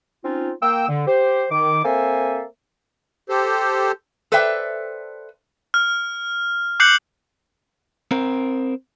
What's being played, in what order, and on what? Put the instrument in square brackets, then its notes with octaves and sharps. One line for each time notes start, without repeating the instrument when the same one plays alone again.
[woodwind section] C4 C#4 D#4 F4
A#3 G5 E6
D3
G4 C5
D#3 D6
A#3 C4 A4 C5 E5 G#5
[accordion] G4 A4 C5
[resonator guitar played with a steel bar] A4 B4 C5 D5 E5 G5
[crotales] F6
D6 F#6 G6 C7 C#7 F#7
[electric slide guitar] C4 A#4